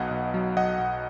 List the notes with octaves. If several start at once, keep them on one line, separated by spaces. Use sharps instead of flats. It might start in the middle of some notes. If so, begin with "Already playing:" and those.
Already playing: B1 B2 D#5 F#5
B1
F#3
B1 D#5 F#5
B1